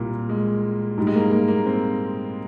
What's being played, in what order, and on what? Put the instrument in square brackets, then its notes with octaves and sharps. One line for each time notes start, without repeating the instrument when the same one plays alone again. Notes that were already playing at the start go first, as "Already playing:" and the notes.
Already playing: [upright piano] C2 A#2 G3 A#3
G#3
G#2 G3
G#3
A#3
A#3
A#3
C4